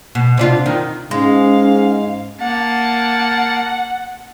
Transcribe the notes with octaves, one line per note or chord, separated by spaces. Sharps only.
B2
C3 D4 F4
D#3
G#2 G#3 C#4 F5
A#3 F#5 A5